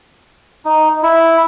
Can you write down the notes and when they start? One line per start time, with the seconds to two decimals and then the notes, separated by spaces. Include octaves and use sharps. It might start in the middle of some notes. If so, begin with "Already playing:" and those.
0.65 D#4
1.03 E4